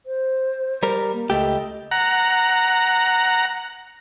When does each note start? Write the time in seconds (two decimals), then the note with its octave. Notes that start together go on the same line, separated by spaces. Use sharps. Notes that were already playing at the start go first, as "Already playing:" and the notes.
0.06 C5
0.83 G3 A#4
1.13 A#3
1.30 C#2 A3 G4 D#5
1.91 F#5 A#5